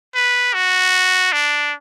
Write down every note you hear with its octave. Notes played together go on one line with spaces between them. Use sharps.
B4
F#4
D4